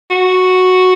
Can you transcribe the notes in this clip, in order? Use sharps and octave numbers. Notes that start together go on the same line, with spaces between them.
F#4